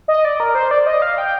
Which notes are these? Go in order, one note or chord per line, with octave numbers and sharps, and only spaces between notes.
D#5
D5
A#4
C5
D5
D#5
F5
G5